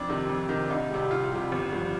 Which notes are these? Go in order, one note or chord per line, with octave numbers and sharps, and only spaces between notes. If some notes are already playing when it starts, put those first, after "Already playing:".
Already playing: F2 D4
C3 D#3
F2
C3 D#3
D4
C2 D#4
C3 G3
C2 F4
C3 G3
G1
G2 F3